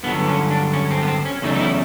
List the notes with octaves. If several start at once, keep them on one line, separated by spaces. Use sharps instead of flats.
G2 D3 F#3 B3
C#4
D4
C#4
C4
B3
C4
C#4
E2 C#3 F#3 A3 D#4
D#4
E4